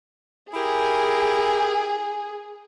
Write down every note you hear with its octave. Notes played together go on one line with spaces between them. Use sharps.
E4 G4 G#4 A#4